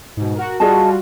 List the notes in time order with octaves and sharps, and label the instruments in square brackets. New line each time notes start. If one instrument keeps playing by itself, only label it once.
[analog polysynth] G#2 B2
F#4 A#4
[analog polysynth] G3 F4 F#4 [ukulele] G#4 D#5 A5